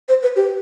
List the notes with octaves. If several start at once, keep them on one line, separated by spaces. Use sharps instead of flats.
C5
B4
G4